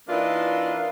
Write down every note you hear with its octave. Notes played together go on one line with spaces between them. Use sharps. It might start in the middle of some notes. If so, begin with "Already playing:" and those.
E3 A#3 D4 D#4 F4